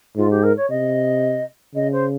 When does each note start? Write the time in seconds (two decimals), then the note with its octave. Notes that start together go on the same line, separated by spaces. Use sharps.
0.17 G#2 F4
0.30 G4
0.43 A#4
0.57 C#5
0.69 C3 D#5
1.75 C#3 D#5
1.92 C5